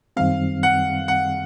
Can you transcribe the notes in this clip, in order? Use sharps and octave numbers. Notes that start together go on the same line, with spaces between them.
F#2 D#3 G3 C4 F5
F#5
F#5